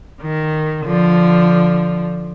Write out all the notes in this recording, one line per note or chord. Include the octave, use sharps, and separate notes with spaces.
D#3
D3 F3